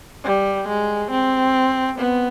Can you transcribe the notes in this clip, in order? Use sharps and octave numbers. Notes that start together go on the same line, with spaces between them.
G3
G#3
C4
B3